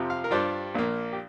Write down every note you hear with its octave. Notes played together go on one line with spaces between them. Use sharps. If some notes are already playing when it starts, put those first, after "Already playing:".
Already playing: F2 C3 F3
F5
A#4
G2 G3 D4 F4 C5
A#1 A#2 A#3
G4